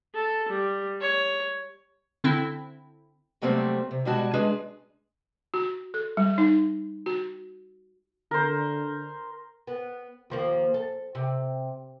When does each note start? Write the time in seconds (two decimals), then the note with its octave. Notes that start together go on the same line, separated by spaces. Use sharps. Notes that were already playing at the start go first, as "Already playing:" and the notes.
0.14 A4
0.49 G3
1.01 C#5
2.24 D3 C4 E4
3.42 C3 F#3 G3 A3 A#3 C4
3.91 C3
4.05 B2 G3 G#3 F#4 A5
4.34 G#3 D4 G#4 B4
5.54 F#4
5.94 A4
6.17 G3
6.38 D#4
7.06 F#4
8.31 D3 A#4 C5
9.67 B3
10.30 D#2 F3 A#3
10.74 A4
11.15 C3